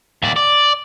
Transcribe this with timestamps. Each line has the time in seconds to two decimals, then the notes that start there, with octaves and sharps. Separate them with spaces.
0.23 D#2 D5
0.36 D5